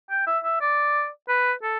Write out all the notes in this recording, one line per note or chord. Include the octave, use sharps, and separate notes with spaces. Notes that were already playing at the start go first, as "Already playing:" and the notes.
G5
E5
E5
D5
B4
A4